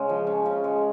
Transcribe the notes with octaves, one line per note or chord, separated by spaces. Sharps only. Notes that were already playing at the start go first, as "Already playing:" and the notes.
Already playing: C#3 G#3 C#4
F3
C#4
C#3
G#3